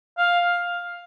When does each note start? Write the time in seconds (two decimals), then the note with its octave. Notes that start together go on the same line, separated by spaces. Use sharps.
0.18 F5